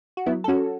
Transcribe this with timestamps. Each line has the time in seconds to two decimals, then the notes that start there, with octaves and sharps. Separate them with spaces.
0.17 F#4
0.26 F#3 B3 E4
0.44 A4
0.48 C#4 F#4